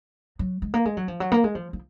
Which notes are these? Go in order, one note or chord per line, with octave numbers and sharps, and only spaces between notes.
F#3
G#3
A#3
G#3
F#3
F3
F#3
A#3
G#3
F3
F3